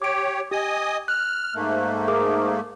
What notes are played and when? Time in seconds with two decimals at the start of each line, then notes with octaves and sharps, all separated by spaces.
0.02 G4 C#5 D6 D7
0.51 G4 D#5 G#5 D#6
1.08 F6 F#6
1.55 G#2 A3 A#3
2.08 G#4 A#4 D6